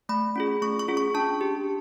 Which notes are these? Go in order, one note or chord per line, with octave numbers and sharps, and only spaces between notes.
A3 B5
C#4 F4 G#4
A3 C#6
C#6
C#4 F4 G#4
C#6
D4 A5
G4